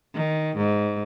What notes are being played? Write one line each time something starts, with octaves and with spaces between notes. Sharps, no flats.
D#3
G#2